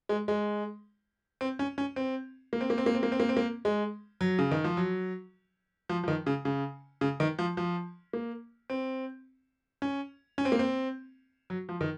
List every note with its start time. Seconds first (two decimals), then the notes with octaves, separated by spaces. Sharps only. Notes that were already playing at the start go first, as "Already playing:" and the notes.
0.09 G#3
0.28 G#3
1.41 C4
1.59 C#4
1.78 C#4
1.96 C4
2.53 A#3
2.61 C4
2.70 A#3
2.78 C4
2.86 A#3
2.95 C4
3.03 A#3
3.12 C4
3.20 A#3
3.29 C4
3.37 A#3
3.65 G#3
4.21 F#3
4.39 C#3
4.52 D#3
4.64 F3
4.77 F#3
5.89 F3
6.04 F3
6.08 D#3
6.26 C#3
6.45 C#3
7.01 C#3
7.20 D#3
7.39 F3
7.57 F3
8.13 A#3
8.70 C4
9.82 C#4
10.38 C#4
10.45 C4
10.52 A#3
10.59 C4
11.50 F#3
11.69 F3
11.81 D#3